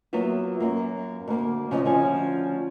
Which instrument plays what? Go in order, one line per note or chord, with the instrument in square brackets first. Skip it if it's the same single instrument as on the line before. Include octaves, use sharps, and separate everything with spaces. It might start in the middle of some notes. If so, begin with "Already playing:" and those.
[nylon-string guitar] F#3 A#3 B3 F4 E5
F#2 A#3
D2 A#3
C#3 F3 D#5
D2 F3 C#4 G#5